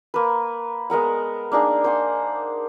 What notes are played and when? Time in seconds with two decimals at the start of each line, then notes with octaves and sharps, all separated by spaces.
0.14 A#3 B4
0.90 G#3 B3 A#4 F#5
1.52 A#3 D4 D#4 G#4
1.84 C5 F#5 G#5